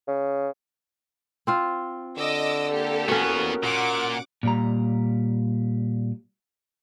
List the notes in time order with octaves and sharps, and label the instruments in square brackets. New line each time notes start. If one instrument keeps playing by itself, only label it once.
[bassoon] C#3
[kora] C4 F4 F5
[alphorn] D3 [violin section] D#5 D6 E6
[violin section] A#3 G4 A4
[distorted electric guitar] E2 B3 [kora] C#4 F#4 [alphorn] A#4
[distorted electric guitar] A#2 [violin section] F#5 D6
[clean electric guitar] A#2 G3 A#5